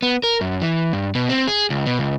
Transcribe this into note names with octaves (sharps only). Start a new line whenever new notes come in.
B3
A#4
F#2
E3
G2
B2
C4
G#4
C#2
B2
C#2